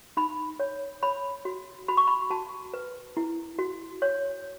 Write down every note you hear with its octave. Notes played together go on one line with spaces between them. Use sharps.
D#4 B5
C#5
C#5 B5
F#4
F#4 B5
C#6
B5
F#4 A5
B4
E4
F#4
C#5